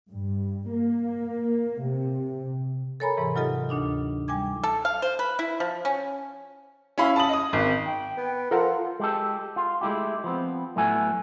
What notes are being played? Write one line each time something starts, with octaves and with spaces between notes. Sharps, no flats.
G2
A#3
C3
A4 A#4 C#5 G#5 A#5 B5
G#2 C3 E3
F#3 D#4 F4 G4 A4 D#5
D2 D4 D#4 F4
G3 G5 G#5 D6 G#6
A4
F5
C5
B4
E4
F3
C#4
C#4 E4 F5 B5
A5 B5 D#6 F#7
D#5 D#6
G#1
G5
B3
F3 F4 A4 A#4 F#5
G#3 G4 A4
F4
G#3 A3 E4 G4
F3 B3 C4
A2 F#3 A3 B3 A4 G#5